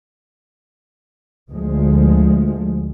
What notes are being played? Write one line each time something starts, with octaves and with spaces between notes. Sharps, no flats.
D2 F3 G#3